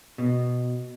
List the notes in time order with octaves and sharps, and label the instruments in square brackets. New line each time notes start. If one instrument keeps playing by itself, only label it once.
[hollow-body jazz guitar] B2